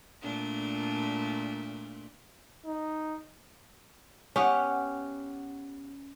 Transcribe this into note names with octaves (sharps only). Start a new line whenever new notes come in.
A#2 A3 D4
D#4
B3 C#4 G4 F#5